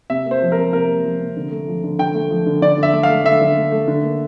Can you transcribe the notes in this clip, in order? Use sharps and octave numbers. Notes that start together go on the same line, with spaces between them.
C3 E5
A#3
C5
F3
A#4
C3
C3 A#4
A#3
F3
C3
D3
A3
F3
D3
D3 G5
A3
F3
D3
D3 D5
D3 E5
A3
F5
A3
D3 E5
D3
A3
A3
D3
A#3